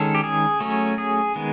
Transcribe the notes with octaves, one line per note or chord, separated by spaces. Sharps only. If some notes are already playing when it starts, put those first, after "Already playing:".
Already playing: D#3 G#3 C#4 A4
G4
G#4
F#3 A3 C#4
G#4
D#3 G#3 B3